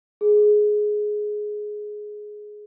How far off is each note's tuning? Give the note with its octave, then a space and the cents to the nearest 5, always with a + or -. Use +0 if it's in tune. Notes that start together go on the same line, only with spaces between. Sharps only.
G#4 +15